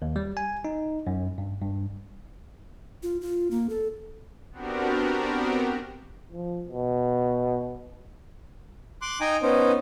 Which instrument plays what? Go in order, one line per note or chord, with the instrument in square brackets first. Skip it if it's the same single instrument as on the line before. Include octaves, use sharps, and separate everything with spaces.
[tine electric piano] D#2
G3
G#5
D#4
F#2
G2
G2
[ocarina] F4
F4
A#3
A4
[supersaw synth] B3 C4 D4 F#4 G4 A#4
[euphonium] F3
B2
[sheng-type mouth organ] C6 D6 F#6
D#4 G5 G#5 A#5
B3 C#4 D#4 C5